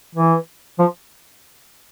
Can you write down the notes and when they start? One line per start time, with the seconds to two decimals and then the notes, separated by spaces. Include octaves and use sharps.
0.15 E3
0.79 F3